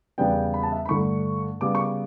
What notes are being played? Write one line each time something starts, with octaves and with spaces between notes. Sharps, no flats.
E2 C#3 G3 B3 D4 G5
B5
A5
E5
B5
G2 D3 A3 C#6
C#3 G3 B3 D6
C#6
D6